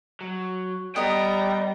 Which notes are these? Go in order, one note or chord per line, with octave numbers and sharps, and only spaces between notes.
F#3
G3 B3 D#5 G5 A#5